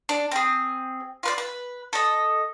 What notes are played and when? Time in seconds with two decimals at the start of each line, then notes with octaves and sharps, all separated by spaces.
0.09 D4
0.32 C4 G#4
1.23 F4 B4 D5
1.38 B4
1.93 A4 D#5